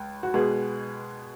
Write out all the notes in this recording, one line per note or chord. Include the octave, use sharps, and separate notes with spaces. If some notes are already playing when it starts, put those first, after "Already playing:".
Already playing: C#2
F#4
B2 G#3 B3 G#4